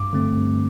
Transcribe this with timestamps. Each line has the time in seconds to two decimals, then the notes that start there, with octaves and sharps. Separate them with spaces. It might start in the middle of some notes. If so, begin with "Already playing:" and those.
Already playing: G2 D6
0.13 D3 A3 C4
0.36 G2